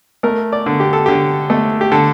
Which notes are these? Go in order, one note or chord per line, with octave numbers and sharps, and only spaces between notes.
A3 A#4
D5
D3
G4
A4
D3 G4
A3
G4
D3 A4